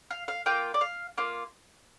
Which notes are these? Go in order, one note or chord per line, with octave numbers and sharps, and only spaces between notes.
F5
F5
A#3 F4 G5
D5
F5
A#3 F4